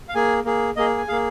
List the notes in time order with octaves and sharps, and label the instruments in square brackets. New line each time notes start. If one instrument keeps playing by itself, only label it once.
[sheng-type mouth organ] F5
A#3 G#4 G#5
A#3 G#4
A#3 G#4 D#5
G#5
A#3 G#4 F5